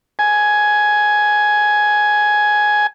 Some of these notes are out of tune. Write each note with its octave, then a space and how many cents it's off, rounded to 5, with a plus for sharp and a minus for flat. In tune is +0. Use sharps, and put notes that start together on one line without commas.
G#5 +10